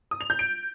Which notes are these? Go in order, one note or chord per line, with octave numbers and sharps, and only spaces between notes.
D#6
F7
G6
D7